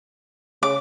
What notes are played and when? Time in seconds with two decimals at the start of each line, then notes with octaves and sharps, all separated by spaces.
0.63 C#3 D6